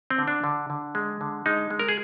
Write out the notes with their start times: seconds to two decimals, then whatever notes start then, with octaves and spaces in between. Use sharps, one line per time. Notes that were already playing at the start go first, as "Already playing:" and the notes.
0.10 C4
0.18 D3
0.28 D4
0.44 D3
0.70 D3
0.95 G#3
1.21 D3
1.46 G#3 D#4
1.70 G#3
1.79 A#4
1.88 G#4